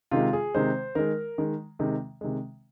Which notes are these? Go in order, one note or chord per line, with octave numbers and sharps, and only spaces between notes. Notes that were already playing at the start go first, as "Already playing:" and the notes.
C3 D#3 G#3 F4
G#4
C3 D#3 G#3 C5
D#3 G#3 A#4
D#3 G#3
C3 D#3 G#3
C3 D#3 G#3